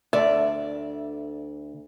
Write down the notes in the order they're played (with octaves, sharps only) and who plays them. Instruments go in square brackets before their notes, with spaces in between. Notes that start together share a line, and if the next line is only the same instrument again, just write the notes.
[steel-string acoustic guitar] D2 [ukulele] D5 [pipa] E5